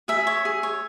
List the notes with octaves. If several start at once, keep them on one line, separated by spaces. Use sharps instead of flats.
G#4 E5
C#5
G#4
C#5